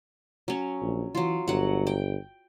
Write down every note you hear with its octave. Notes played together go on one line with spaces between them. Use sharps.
F#3 C#4
A#1
E3 F#3 F4
G1 F#3 F#5
G5